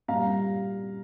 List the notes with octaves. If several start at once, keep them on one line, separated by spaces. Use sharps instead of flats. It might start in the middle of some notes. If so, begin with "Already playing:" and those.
A#2 G3 F5 A#5